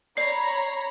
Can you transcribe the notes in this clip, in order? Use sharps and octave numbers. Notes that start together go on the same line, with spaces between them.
C#5 D5 A#5 B5 C7